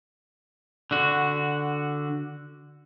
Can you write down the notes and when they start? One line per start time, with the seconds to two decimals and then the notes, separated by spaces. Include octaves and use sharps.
0.91 D3 F#4